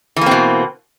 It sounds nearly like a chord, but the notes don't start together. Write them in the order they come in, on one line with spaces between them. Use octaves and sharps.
E3 A#3 C4 B2